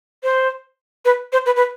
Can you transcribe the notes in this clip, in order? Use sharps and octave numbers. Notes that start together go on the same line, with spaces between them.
C5
B4
C5
B4
B4